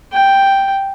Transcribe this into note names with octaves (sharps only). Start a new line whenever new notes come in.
G5